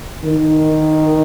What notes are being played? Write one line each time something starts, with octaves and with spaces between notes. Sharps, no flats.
D#3